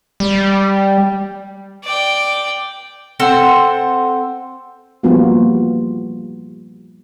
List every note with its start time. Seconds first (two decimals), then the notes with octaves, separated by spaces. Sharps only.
0.20 G3
1.84 D5 G5
3.20 C4 A4 C5 F#5
5.03 F3 G3 A#3 B3 F4 F#4